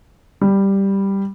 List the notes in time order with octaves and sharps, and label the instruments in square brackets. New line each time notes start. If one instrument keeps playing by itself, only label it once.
[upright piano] G3